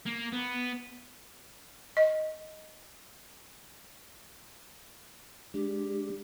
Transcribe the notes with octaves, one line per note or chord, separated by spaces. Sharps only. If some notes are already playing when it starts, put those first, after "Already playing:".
A#3
B3
D#5
G#3 D4 G4